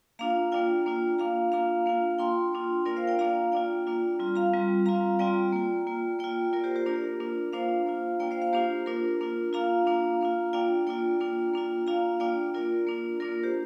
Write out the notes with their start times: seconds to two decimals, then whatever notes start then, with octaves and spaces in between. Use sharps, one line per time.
0.19 A#3 D4 F4 F5 A#5
0.52 A#3 D4 F4 D5 G5
0.86 A#3 D4 F4
1.18 A#3 D4 F4 F5 A#5
1.52 A#3 D4 F4 F5 A#5
1.86 A#3 D4 F4
2.19 A#3 D4 F4 G5 C6
2.53 A#3 D4 F4
2.85 A#3 D4 F4 A#4 D5
2.96 C5 F5
3.08 D5 G5
3.19 A#3 D4 F4 F5 A#5
3.52 A#3 D4 F4 D5 G5
3.87 A#3 D4 F4
4.19 G3 C4 F4
4.35 F5 A#5
4.53 G3 C4 F4
4.86 G3 C4 F4 F5 A#5
5.19 G3 C4 F4 D5 G5
5.52 A#3 F4
5.87 A#3 F4
6.19 A#3 F4 D5 G5
6.53 A#3 F4 A#4 D5
6.64 G4 C5
6.76 G4 C5
6.86 A#3 D4 F4 A#4 D5
7.20 A#3 D4 F4
7.53 A#3 D4 F4 C5 F5
7.86 A#3 D4 F4
8.20 A#3 D4 F4 D5 G5
8.31 C5 F5
8.42 C5 F5
8.53 A#3 D4 F4 G4 C5
8.86 A#3 D4 F4 A#4
9.20 A#3 D4 F4
9.53 A#3 D4 F4 F5 A#5
9.86 A#3 D4 F4
10.21 A#3 D4 F4
10.53 A#3 D4 F4 D5 G5
10.87 A#3 D4 F4 D5 G5
11.20 A#3 D4 F4
11.53 A#3 D4 F4
11.87 A#3 D4 F4 F5 A#5
12.20 A#3 D4 F4 D5 G5
12.54 A#3 D4 F4 A#4 D5
12.87 A#3 D4 F4
13.20 A#3 D4 F4 A#4 D5
13.43 G4 C5